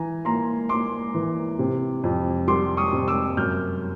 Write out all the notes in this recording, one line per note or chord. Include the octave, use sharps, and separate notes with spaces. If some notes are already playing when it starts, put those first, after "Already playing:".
Already playing: E3 G#5 A#5
A#3 A#5 C6
A#3 C6 D6
E3
C3
F2
G3 C6 D6
C#6 D#6
C3
D6 E6
F#2 F6 G6